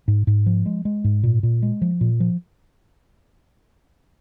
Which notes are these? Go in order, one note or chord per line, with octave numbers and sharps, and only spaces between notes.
G#2
G#2
F3
G#3
G#3
G#2
A#2
A#2
G#3
F3
A#2
F3